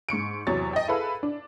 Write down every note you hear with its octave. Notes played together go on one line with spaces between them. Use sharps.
G#2 C#6 C#7 D7
E2 C3 F#3 C#5 A6
D#5 G5
E4 G#4 A4 B4 F5
D4